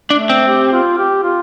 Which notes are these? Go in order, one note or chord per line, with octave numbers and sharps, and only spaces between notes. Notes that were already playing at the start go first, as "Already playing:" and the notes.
A3 D4
C4
G4
F4
G4
F4